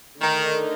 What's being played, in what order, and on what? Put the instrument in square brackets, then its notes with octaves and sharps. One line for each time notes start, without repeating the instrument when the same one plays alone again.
[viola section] D3 A3 D#4 A#4 [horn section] D#3